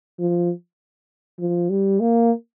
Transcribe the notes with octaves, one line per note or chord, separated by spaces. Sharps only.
F3
F3
G3
A#3